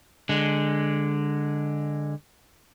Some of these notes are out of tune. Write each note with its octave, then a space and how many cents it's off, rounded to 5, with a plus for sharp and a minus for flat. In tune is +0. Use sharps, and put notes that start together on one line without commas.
D3 +0 G#3 -15